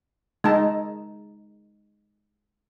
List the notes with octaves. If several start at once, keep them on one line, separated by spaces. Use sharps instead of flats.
G#3 D#4 A5